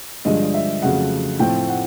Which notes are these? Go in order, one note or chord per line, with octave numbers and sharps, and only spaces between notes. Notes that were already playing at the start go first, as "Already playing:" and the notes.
G2 D3 F3 G#3 D#5
E5
F2 C#3 F#3 A3 F#5
A2 F3 A3 C4 G5
F#5